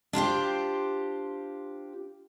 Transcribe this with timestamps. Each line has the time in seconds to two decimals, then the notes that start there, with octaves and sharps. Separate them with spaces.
0.13 D4 F4 G4 C5